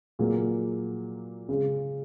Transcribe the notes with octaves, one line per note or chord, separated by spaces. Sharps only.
A#2 F#3 A#3 G#4
C#3 G#3 C#4 G#4